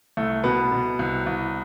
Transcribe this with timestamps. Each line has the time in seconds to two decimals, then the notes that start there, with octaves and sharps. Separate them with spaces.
0.17 C2 A3
0.44 B2 B3
0.72 B2
0.99 C2
1.26 C2